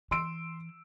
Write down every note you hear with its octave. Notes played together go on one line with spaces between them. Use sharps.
E3 C6 E6 D7